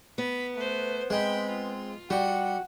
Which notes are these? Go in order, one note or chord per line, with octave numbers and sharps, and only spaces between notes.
B3 B5
A3 B4 C5
G#3 C4 G5 B5
F4
G3 F#4 F#5